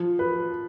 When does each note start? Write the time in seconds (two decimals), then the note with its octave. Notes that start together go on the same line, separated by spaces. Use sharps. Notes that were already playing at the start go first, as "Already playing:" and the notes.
Already playing: F3
0.19 B4